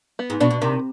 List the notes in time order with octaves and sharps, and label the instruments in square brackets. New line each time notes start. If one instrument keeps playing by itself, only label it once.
[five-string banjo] B3
[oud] G#2
[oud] B2 [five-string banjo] D4
[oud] B2
[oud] C3 [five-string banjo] D#3